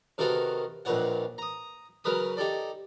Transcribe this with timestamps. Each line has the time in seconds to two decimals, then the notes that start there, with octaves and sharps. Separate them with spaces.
0.18 C3 D#3 B3 F#4 A4 A#4
0.85 A#1 F2 A#2 B4 C#5 F#5
1.38 A#5 D#6
2.04 C#3 F#3 A#4 B4 B5 D#6
2.37 D#4 G4 A4 D5